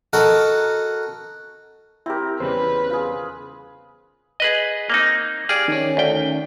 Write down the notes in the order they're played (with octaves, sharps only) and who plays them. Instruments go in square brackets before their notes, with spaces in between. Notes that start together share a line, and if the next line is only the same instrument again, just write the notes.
[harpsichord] F#4 A4 A#4 D#5 F#5
[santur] C4 A#4 [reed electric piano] E4 G4
[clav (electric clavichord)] E2 C#3 G3 [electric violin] B4 [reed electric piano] C5
[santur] F4 G#4
[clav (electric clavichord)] G#4 B4 D#5
A#3 C4 D#4
[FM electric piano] G4 F5 [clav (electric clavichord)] G#4 D5
[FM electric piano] D#3 C#4
[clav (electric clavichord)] D2 G5